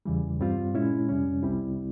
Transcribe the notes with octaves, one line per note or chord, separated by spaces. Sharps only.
E2 C#3 E3 G3
G2 G3 C4 F4
A#2 G#3 C#4 E4
F2 C3 G3 C#4
C2 C3 G3 C4 E4